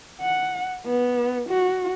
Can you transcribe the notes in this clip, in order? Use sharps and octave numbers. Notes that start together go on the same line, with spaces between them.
F#5
B3
F#4